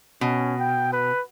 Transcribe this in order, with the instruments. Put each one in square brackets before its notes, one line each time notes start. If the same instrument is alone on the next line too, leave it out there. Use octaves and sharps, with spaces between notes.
[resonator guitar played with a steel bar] B2 [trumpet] C#4
[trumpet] G5
B4